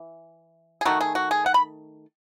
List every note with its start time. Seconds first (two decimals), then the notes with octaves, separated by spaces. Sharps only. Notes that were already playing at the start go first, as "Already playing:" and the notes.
Already playing: E3
0.81 G#4
0.85 D#3 A3 D#4 F#4
1.01 G#4
1.15 F#4
1.31 G#4
1.46 F#5
1.54 B5